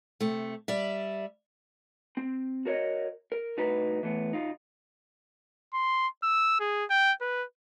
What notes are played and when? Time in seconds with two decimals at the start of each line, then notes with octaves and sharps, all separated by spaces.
0.20 C3 A3
0.68 G3 D5 E5
2.17 C4
2.65 F#4 A#4 C#5 D#5
3.32 A#4
3.57 C2 A2 D#4 F#4 B4 A#5
4.03 E3 A3 B3
4.32 B1 D#4 F4
5.74 C6
6.23 E6
6.60 G#4
6.90 G5
7.21 B4